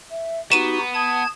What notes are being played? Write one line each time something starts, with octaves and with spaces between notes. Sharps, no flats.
E5
B3 D#4 F#4 G4 D#7 E7
A5 D#6 G#6